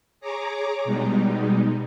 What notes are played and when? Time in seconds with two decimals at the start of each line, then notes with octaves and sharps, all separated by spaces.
0.20 G#4 C#5 A#5 D6
0.84 B2 G3 G#3 D#4